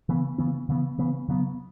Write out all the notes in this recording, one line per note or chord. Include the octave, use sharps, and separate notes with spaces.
C#3 E3 B3
C#3 E3 B3
C#3 E3 B3
C#3 E3 B3
C#3 F#3 B3